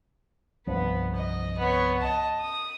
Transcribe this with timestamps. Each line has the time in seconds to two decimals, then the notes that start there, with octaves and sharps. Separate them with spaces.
0.67 C2 G2 F3 B3
1.15 D#5
1.59 B3 C#5
2.00 D#5 A5
2.40 D#6